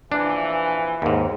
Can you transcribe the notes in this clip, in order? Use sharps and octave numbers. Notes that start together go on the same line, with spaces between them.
A#1 E3 D4
D#2 G#2